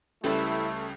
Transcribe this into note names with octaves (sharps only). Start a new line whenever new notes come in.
C#2 C#3 G3 A3 E4 A4 B4 C5